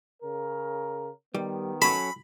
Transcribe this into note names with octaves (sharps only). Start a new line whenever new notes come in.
C#3 A#4
D#3 G3 B3
F#3 C#4 A4 B5